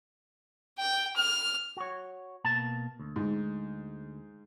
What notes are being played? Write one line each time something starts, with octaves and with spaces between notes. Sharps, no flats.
G5
F6
F#4 C#5
B2 A#3 A5
D2
G#2